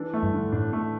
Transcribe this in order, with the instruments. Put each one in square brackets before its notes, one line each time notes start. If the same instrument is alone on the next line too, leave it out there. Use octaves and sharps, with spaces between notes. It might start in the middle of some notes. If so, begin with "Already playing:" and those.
Already playing: [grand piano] E3 D4
A3
[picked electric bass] G2
[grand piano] D3
[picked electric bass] A2 [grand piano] D4
[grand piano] A3